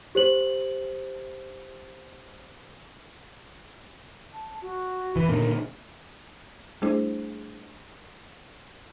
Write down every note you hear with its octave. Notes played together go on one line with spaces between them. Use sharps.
G4 C5 F#7
A5
F#4
E3 B4
A#2 D3 D#3 A#4
G3 A3 D4 E4 G#4 C5